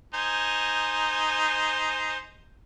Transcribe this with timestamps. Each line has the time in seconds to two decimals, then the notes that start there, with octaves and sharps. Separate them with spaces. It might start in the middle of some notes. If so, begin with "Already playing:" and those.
0.14 D#4 C5 G#5